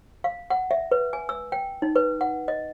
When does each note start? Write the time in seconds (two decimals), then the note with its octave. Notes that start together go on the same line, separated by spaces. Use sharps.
0.24 F5
0.50 F#5
0.71 E5
0.92 B4
1.13 G#5
1.29 E6
1.52 G5
1.82 D#4
1.96 B4
2.21 F#5
2.48 D#5